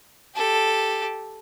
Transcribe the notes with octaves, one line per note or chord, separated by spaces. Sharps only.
G4 A4